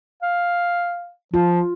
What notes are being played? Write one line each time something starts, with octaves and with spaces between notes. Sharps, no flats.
F5
F3 F4